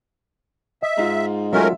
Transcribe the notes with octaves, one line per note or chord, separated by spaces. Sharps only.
D#5 E5
G#2 D#4 F4
F#3 G#3 A3 C#4 F4 A#4 E5